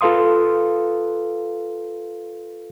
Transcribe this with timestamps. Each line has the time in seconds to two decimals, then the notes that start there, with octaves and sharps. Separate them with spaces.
0.01 F4 A4 B4 F5 C6 D#6